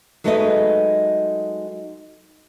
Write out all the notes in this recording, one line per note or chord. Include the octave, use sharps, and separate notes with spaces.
F#3 G#3 A3 D#4 B4 D#5